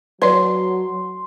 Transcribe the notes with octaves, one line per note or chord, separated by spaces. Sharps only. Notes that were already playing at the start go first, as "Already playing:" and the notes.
F#3 B4 C#5 D5 C6